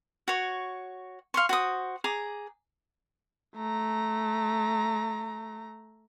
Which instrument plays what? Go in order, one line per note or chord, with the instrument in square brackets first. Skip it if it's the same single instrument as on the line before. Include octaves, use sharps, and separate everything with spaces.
[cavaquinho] F#4 C#5
F5 C6 C#6
F#4 C5 D#6
G#4 A#5 D6
[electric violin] A3 A#5